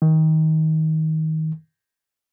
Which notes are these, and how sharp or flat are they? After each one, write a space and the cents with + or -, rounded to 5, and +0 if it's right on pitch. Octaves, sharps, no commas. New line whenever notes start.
D#3 +25